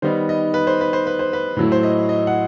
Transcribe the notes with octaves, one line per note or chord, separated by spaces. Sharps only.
D#3 G3 B3 D#4 C5
D#5
B4
C5
B4
C5
B4
C5
B4
A2 F#3 A3 E4
C5
D#5
D#5
F#5